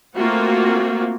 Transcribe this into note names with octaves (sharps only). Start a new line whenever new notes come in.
A3 A#3 C4 F4 F#4